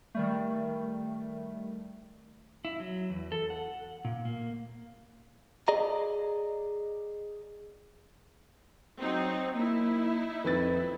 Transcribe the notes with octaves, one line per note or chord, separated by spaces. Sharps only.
D#3 G3 A3
E4
F#3
E2
A4
F#5
A#2
A#3
G#4 D5 D#5 A#5
F#3 C4 D#4
A#3 D#4 E4
F2 D#3 B4 A6